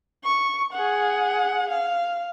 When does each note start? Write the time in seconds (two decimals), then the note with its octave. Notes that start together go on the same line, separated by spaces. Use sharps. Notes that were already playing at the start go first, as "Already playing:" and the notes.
0.24 C#6
0.73 G#4 F#5
1.70 F5